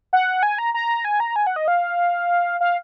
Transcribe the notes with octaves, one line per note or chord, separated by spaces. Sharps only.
F#5
G#5
A#5
A#5
G#5
A#5
G#5
F#5
D#5
F5
F5